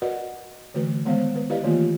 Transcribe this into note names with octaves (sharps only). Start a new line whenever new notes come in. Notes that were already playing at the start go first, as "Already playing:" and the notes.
F#4 A#4 B4 D5 D#5 F#5
D3 E3 A3 F#4 B4
D#3 G#3 B3 C5 F5
B4
E4 G4 B4 D5 D#5 F5
D#3 E3 A3 A#3 F4